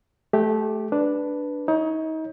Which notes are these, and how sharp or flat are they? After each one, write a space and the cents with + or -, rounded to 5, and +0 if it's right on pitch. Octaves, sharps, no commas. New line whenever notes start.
A3 -20 G4 +0
D4 +0 B4 +0
D#4 +35 C#5 +0